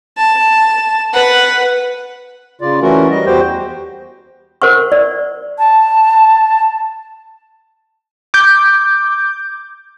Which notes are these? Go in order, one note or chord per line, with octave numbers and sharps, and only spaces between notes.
A5
B4 F#5
C#3 F4 D5
E3 A3 C#4 F#4 A#4
G3 D#5
E2 F#4 G4 C5 G5
A#4 C5 F#5 C#6
D5
A5
D6 G6